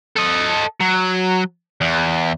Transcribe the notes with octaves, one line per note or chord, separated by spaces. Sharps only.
A4 D#5
F#3
E2